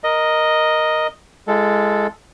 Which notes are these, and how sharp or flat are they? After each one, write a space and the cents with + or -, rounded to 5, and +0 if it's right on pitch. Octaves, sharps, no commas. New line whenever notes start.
A#4 +5 D#5 +0
G#3 +0 F4 -45 A4 +0